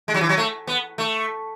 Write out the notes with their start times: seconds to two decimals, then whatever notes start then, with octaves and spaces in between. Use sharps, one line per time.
0.08 G#3
0.14 F#3
0.21 E3
0.29 F#3
0.37 A3
0.67 B3
0.98 A3